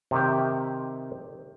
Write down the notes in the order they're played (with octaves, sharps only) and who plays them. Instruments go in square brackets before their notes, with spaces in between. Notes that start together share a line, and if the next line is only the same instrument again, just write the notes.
[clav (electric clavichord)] C3 D#3 G4